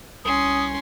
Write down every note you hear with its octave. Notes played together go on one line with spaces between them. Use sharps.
C2 C#4 C6 D#6